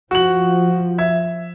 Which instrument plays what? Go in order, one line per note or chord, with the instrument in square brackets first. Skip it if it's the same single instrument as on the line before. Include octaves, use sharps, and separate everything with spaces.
[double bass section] F3 [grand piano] F#4 F#7
[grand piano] E5 G#6